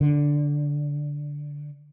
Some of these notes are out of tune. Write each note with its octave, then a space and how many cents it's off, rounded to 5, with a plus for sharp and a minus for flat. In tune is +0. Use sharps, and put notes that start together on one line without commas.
D3 -5